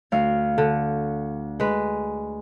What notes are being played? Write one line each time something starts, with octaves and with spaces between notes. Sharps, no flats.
D2 F5
D3
G#3 B4